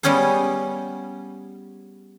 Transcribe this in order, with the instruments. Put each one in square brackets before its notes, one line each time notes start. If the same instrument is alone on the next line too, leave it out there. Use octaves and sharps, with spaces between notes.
[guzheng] G3 B3 C#4 G#4 C5